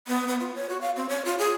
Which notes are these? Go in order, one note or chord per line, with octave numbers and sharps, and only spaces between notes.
B3
B3
F4
C#5
F#4
F5
C4
C#5
F4
G#4